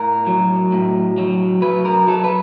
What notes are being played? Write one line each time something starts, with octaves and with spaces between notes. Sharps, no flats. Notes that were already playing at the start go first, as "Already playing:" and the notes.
Already playing: A2 A#4
F#3
A2
F#3
F#3 B4
A#4
F#3 A4
B4